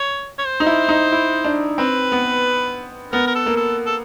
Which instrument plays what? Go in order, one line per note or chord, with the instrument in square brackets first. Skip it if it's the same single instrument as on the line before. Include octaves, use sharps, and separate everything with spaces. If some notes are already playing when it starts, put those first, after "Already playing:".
Already playing: [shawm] C#5
C#5
C5
[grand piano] D#4
E4
D#4
E4
D4
[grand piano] C4 [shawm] B4
[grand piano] B3
[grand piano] B3 [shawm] A#4
[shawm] A#4
A4
[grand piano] A#3
[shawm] A4
A4